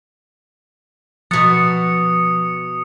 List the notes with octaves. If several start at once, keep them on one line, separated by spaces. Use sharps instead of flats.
B2 F3 F#5 D#6 A6 C#7